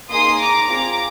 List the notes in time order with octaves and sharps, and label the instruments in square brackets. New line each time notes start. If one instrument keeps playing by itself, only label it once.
[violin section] A#3 D#4 G#4 C6 D#6
A#5 D6
C4 F4 G#4 A#5 D6